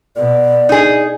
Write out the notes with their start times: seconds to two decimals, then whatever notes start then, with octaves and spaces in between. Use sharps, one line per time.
0.16 B2 D5
0.69 D#4 G#4